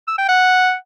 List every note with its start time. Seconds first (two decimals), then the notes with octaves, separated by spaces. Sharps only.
0.08 E6
0.18 G5
0.29 F#5